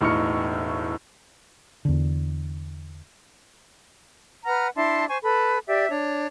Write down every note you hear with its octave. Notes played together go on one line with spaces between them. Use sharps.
E1 A2 D#4 C#6 F6 C#7
E2 D3
B4 F#5 A#5 F6
D4 E4 A5 C6
C5 G#5 C#6
A4 B4 B5
G4 D5 E5
D4 C#5